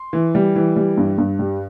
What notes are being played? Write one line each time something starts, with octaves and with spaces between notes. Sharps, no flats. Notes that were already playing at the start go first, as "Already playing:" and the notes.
Already playing: C6
E3
G3
E3
G3
G2
G2
G3